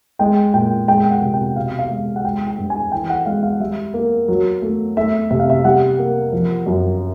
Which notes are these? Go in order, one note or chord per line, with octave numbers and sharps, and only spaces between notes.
G#3 G5
A#2 G5
G#3 G5
F#5
C3
G5
B2 F5
F5
G#3
F#5
G#3 G5
G5
G2
G#5
E3 G5
F#5
G#3 F5
F5
G3 E5
A#3
F#3
A3
A3 E5
C3 E5
F5
E5
G3 F#5
A#3
F3
F#2